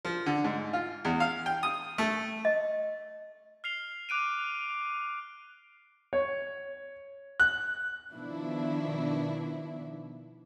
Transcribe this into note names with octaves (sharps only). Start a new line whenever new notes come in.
F3
D3
G#2
F4
E2
F5
G5
D#6
A3
D#5
F6 C7 F7 G7
D6 F#6 D7 D#7
C#5
F#6
B2 D#3 F3 B3 D4 E4